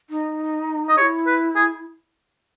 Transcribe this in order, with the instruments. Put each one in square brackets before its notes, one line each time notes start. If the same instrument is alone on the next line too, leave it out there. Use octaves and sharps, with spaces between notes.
[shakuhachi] D#4
[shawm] D#5
[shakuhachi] G#4 [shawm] C#5
[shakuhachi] E4
[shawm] B4
G#4